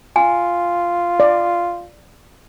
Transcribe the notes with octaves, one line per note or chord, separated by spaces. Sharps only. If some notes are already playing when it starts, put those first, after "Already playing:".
F4 G#5
D5